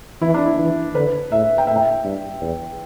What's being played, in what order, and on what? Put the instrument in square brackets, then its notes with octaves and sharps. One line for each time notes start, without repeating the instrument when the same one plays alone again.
[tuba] E3 [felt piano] E4
[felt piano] D4
E4
[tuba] E3
[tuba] D3 [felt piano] B4
[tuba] A2 [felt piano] E5
[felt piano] G5
[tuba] A2 [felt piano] E5
[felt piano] G5
[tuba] G2
E2